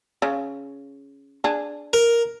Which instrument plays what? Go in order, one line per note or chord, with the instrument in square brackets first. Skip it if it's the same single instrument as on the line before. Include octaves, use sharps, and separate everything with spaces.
[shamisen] C#3
D4 G#4
[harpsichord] A#4